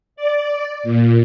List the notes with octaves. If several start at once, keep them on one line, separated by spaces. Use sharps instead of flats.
D5
A#2